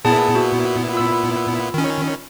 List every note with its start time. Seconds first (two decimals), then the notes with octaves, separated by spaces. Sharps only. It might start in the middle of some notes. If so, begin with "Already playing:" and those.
0.05 A#2 B3 E4 G#4 A5
0.35 F#4
0.93 F4 B5 E6
1.74 D#3 C#4